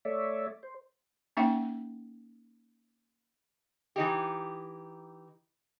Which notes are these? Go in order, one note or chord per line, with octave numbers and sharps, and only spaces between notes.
A3 C#5 D5 E5
C5
A#3 C#4 D#4 E5 F#5 G5
E3 D#4 G4